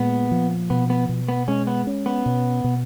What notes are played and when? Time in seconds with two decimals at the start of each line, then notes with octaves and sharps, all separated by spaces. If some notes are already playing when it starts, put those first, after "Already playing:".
Already playing: A#2 G#3 B3
0.31 F3
0.70 B2 B3
0.90 B3
1.09 B2
1.29 B3
1.48 G#3 C#4
1.67 B3
1.87 C#4
2.06 B3
2.26 B2
2.64 B2